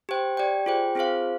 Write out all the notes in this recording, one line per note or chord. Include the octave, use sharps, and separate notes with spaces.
G4 C5 G5
G4 D5 G5
F4 G#4 C5 G5
C4 F4 G#4 C5 F5